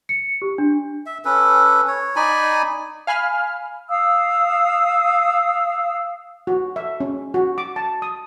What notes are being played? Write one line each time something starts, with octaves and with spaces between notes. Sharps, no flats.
C#7
G4
D4
E5
C#4 A4 B4
C#5
D#4 D5 G#5 B5
F5 G#5 B5 F6
F5 D#6 E6
F#4
E5
C#4
F#4
D6
A5
D#6